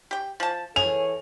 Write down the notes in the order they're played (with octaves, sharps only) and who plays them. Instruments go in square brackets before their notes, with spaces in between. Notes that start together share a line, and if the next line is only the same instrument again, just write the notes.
[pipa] G4 G5
F3 A5
[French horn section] E3 A4 C#5 [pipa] G#4 [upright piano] F7